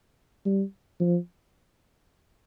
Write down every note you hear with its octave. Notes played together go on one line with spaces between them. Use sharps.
G3
F3